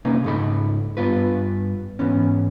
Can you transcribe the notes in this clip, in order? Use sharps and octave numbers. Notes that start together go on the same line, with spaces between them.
C3 A#3 C#4 D#4 B4
C#2 G#2 D#4 A4 B5
G2 B3 F4 B4
G#2 E3 B3 C#4